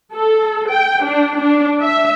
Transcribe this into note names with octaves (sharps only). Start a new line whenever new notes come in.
A4
G5
D4
D4
E5